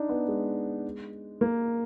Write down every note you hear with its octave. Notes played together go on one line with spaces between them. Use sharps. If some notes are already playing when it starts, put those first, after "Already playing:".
Already playing: D4 D#4
B3
G#3
A#3